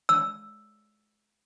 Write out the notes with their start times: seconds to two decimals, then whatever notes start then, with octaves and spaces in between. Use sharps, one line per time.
0.09 E6